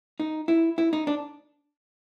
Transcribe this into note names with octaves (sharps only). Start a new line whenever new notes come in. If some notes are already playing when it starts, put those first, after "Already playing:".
D#4
E4
E4
D#4
D4